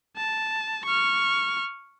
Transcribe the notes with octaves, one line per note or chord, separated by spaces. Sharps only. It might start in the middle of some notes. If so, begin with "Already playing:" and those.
A5
C#6 F6